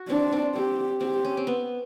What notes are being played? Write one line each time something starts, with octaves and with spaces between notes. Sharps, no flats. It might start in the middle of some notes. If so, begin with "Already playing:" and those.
Already playing: F#4
C4 D4
C4
C4 G4
C4 G4
C#4
C4
B3